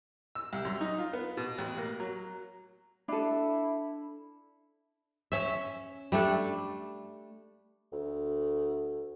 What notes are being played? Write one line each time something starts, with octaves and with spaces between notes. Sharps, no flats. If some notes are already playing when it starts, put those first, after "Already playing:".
E6
C2
F#2
D#4
F4
B3
B2
A1
A#3
F#3
D4 E4 A4
C#4 E5
G3 A3 D4 A4
D2